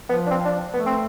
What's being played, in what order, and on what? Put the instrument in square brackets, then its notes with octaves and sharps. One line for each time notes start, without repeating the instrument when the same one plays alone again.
[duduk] F3 [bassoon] B3
[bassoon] D4
C4
D4
[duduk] A3 [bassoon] B3
[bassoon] C4